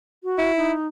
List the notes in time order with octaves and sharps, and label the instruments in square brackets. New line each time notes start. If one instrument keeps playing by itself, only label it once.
[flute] F#4
[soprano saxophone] E4
[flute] D#4